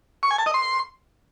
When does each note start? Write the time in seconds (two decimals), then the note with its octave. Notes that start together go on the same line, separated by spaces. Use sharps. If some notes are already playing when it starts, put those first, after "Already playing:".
0.23 C#6
0.31 G#5
0.38 A5
0.46 D#5
0.54 C6